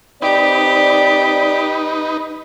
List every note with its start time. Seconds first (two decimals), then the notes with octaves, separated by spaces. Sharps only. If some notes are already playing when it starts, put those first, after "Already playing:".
0.22 C4 D#4 G4 B4 D5